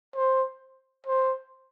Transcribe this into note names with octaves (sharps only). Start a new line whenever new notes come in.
C5
C5